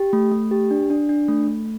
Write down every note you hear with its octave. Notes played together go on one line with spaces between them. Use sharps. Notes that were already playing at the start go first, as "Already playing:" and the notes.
Already playing: G4
A3
A3
G4
D4
D4
D4
A3
A3